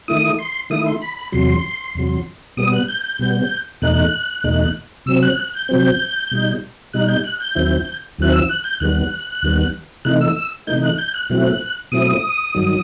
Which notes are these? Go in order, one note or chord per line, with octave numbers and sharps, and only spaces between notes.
D#3 A3 E4 D#6
C6
D#3 A3 E4 D#6
C6
B5
B5
E2 C3 F#3 C6
E2 C3 F#3
B2 G3 B3 D#6
F#6
G6
G6
B2 G3 B3
E2 B2 A3 D#4 F#6
E2 B2 A3 D#4
C3 F#3 C4 E6
F#6
F#6
G6
C3 F#3 C4
B2 G3 D#4
B2 G3 D#4 F#6
G6
F#6
G6
D#2 D#3 F#3 C4 E4
D#2 D#3 F#3 C4 E4 F#6
E6
F#6
G6
D#2 D#3 G3 B3 F#6
D#2 D#3 G3 B3
C3 E3 A3 D#4 F#6
E6
E6
C3 E3 A3 D#4 G6
F#6
G6
F#6
B2 F#3 A3 C4 E4 F#6
B2 F#3 A3 C4 E4 D#6
G2 D#3 F#3